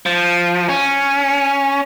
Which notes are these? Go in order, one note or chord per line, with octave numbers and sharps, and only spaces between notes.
F3
C#4